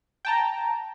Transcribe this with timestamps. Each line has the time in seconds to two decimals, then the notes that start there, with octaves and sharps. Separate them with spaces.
0.25 G5 A5 A#5